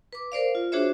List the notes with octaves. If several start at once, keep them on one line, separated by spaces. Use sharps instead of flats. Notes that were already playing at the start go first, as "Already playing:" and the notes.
B4 D6
A#4 C5 D5 F5
F4
D4 F#4 G#4 C5 C#5 E5